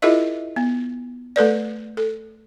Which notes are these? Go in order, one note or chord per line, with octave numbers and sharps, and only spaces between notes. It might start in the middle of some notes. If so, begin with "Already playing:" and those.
E4 F4 G#4 A#4 D#5 E5
B3
A3 A4 B4 D5
A4